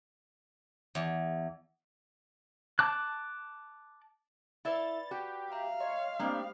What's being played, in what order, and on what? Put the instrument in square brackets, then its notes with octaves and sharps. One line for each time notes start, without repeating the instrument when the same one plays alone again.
[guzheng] E2
[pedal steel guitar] A5 D6 F#6
[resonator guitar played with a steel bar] E4 E5 [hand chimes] B4 D5 B5 [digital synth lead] A6
[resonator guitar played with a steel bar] F#4 [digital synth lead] G4
[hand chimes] E5 A#5 [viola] F5
[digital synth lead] C#5 [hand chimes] D#5 C6
[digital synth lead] G3 [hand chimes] A3 C5 [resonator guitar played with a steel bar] A#3 C4 D4